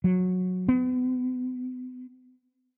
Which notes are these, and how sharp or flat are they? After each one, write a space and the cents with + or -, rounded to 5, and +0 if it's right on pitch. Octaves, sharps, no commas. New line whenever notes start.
F#3 -15
B3 +40